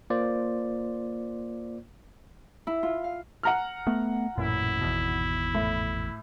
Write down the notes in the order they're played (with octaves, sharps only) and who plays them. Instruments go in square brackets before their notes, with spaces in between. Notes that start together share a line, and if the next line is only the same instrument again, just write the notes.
[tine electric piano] A#3 F4 C5 D5
[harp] E4
F4
F5
[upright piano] F#5 A#5 F6
[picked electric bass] A3 B3
[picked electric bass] A1 F#2 A#2 [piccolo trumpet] E4
[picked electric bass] G#1 E2 B2
[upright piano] A2